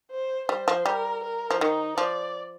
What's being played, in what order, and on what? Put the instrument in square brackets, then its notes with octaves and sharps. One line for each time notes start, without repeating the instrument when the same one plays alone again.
[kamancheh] C5
[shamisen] G3 [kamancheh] C5
[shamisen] F3
[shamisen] G3 [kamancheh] A#4
[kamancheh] A#4
[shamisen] F3
[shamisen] D#3 [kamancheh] D#4
[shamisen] F3 [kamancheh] D5